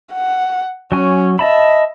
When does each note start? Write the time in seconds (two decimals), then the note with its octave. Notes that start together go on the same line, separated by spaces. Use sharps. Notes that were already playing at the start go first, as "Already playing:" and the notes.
0.13 F#5
0.92 F#3 C#4 G#5
1.39 D#5 E5 A5 B5